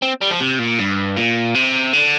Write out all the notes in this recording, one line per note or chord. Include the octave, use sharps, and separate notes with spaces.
C4
G3
F3
C3
A#2
G2
A#2
C3
D3